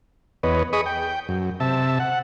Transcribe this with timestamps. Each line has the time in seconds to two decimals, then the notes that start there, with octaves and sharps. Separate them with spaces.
0.43 E2 B3 B4 C#5 D#5
0.73 G#4 D#5 B5 C#6 D#6
0.86 G5
1.29 F#2
1.60 C3 E5 A5
2.00 F#5